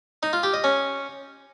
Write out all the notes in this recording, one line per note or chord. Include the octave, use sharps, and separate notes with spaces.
D#4
F4
G4
D#5
C#4